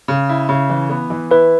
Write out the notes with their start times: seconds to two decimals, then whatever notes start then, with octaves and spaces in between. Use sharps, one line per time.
0.08 C#3
0.29 E4
0.49 C#3
0.70 E3
0.90 B3
1.10 E3
1.31 E4 B4